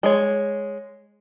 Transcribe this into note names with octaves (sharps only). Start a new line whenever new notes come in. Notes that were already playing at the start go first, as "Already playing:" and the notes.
G#3 C#5